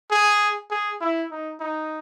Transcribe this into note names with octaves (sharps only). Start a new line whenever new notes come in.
G#4
G#4
E4
D#4
D#4